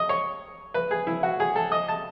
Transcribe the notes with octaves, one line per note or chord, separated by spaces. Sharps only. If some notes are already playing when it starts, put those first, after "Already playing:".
Already playing: D#5
C#5
B4
G#4
E4
F#4
G#4
A4
D#5
A5